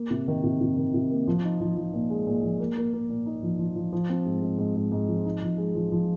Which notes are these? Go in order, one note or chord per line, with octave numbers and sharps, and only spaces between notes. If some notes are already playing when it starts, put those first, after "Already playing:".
Already playing: A#3
C3
D#3
C3
C3
D#3
C3
A#3
F3
D#4
F3
F3
A#2
G#3
A#2
F3
A#3
A#3
A#3
A#2
D#4
F3
F3
F3
F3
C4
G#2
G#2
G#2
G#2
G#2
F3
D#4
F3
G#3
F3
F3